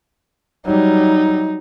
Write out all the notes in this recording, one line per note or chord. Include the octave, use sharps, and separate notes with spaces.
F#3 G3 D#4